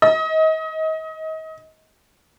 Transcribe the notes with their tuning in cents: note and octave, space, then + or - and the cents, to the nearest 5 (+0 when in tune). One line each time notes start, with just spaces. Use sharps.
D#5 +30